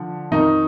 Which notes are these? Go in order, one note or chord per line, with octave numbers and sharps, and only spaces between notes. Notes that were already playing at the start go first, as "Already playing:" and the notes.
Already playing: D3 F3
F2 D#3 D#4